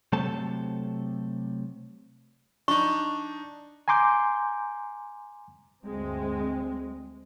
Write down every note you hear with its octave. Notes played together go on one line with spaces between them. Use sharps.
C3 F#3 A3 A4 C5 A5
D4 D#4 C#6
G#5 A#5 C6 D6 G6
D2 G2 G#3 C4